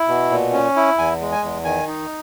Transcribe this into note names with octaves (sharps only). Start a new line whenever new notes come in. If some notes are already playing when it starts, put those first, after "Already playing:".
Already playing: E4
B2
A#2
C#4
E4
E2 G#5
G#3
G#5
E2
D#3 G#5
D#4